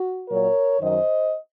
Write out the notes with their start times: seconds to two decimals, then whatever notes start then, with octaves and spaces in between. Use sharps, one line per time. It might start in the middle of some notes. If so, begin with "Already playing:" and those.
Already playing: F#4
0.28 A#2 F#3 A#4 C#5
0.79 F#2 D#3 F#3 C5 D#5